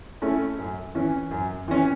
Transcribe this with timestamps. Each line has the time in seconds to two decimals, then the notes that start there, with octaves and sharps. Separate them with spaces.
0.22 A3 C#4 E4
0.58 F#2
0.95 E3 C#4
1.31 F#2
1.68 E3 C#4